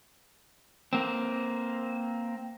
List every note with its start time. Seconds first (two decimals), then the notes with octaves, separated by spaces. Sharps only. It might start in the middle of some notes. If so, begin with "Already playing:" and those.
0.93 A#3 C4